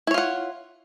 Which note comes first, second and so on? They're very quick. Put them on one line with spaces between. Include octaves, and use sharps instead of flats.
E4 C#5 F4 F#5